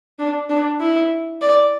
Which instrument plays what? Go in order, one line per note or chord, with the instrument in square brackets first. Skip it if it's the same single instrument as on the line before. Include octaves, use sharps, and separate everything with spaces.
[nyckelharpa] D4
D4
E4
D5